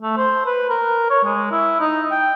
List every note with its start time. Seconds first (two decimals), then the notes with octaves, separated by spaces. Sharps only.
0.02 A3
0.17 C5
0.46 B4
0.70 A#4
1.10 C#5
1.25 G#3
1.51 E4
1.80 D#4
2.11 G5